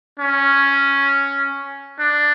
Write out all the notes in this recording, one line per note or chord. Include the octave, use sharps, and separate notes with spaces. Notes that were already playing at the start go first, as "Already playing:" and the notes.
C#4
D4